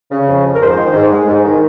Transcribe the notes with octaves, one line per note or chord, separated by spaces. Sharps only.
C#3
F2
F3
A#4
G#2 C5
D#3
G#2
G#3
G#2
D#3